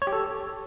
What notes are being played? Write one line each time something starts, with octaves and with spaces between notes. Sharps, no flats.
C#5
G4
A4